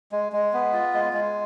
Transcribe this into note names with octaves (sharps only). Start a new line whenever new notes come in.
G#3
G#3
B3
F4
G#3
G#3